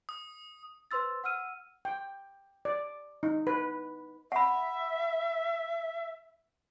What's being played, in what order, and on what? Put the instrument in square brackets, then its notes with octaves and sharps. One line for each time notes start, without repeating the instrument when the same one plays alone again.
[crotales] D#6
[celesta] B4 C5 C6 E6 A6
F#5 E6 F6 D#7
[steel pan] G5
D5
D#4
B4
[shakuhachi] E5 [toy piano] F#5 B5